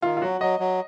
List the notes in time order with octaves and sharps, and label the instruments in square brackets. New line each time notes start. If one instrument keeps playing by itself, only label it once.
[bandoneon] D#3 [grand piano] F4
[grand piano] F4
[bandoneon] F#3 [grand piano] F#4
[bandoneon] F#3 [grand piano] D#5
[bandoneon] F#3